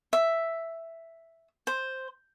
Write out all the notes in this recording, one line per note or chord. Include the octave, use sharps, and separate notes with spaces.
E5
C5